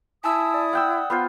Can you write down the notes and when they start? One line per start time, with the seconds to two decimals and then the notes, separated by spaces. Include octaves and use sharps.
0.24 E4 G#5 A5 D#6 E6
0.54 D5
0.73 F#5 G5 E6
1.10 B3 F4 C5